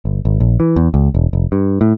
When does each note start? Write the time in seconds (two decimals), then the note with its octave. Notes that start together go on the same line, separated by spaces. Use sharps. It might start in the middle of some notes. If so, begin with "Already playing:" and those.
0.05 G1
0.25 G#1
0.40 A#1
0.60 E3
0.76 E2
0.94 C#2
1.15 E1
1.33 F1
1.52 G2
1.81 A2